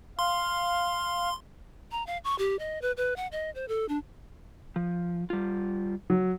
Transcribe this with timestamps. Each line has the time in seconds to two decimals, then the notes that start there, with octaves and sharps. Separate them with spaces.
0.19 F5 C6
1.91 A#5
2.07 F5
2.24 C#6
2.39 G4
2.59 D#5
2.82 B4
2.97 B4
3.16 F#5
3.32 D#5
3.55 C5
3.68 A4
3.89 D4
4.76 F3
5.30 G3 F4
6.10 F#3